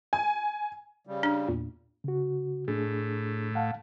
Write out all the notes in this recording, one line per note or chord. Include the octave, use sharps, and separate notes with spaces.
G#5
C#3 G3
D4 F6
E2 A#2
C#3 F#4
A2 A3 D4 G#4
F5 F#5 A5